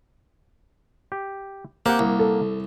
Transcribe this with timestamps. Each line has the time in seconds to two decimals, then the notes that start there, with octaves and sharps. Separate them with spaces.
1.12 G4
1.86 A#3 C4 G4 F#5
1.99 C2
2.19 A4